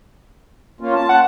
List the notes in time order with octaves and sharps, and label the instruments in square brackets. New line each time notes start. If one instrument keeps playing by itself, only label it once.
[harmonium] A#3 C#4 F4
A5
[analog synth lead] F#5